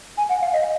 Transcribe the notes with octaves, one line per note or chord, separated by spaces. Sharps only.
G#5
F#5
F5
D#5